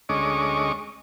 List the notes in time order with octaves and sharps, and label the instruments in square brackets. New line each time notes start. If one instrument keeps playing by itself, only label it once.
[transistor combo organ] D2 G#3 C#4 D#5 C#6 D6